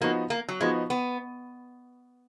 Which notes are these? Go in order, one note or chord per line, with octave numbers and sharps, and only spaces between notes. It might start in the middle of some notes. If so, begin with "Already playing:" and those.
F3 A#3 B3 D#4 F#4
A#3
F#3
F3 G#3 B3 D#4 F#4
B3